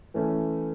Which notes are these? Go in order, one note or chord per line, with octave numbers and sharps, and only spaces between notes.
E3 A3 C#4